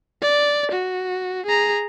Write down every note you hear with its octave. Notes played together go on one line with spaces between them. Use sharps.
D5
F#4
G#4 A#5